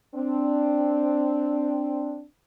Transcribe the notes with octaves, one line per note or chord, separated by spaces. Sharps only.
C4 D4